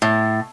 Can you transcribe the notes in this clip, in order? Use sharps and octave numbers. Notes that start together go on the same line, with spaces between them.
A2